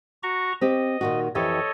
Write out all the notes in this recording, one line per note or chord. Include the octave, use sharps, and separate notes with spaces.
F#4 A#5 C#6
C4 G4 D#5
A#2 D#3 F#4
F2 E3 G4 A4 C#5 D#5